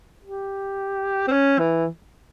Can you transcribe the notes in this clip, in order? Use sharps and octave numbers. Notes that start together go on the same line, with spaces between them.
G4
C4
C#4
E3